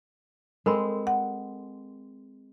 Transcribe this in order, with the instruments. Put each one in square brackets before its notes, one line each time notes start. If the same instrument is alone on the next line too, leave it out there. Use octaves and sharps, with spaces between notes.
[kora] G#3 C4 [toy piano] A4 A#4 B5
[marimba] F#5